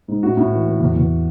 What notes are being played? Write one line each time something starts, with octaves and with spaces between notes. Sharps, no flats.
G#2
A2 F#4
A2
E3
E3
E2
E2